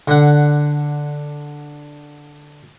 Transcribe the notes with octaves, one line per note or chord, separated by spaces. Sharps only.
D3 F#5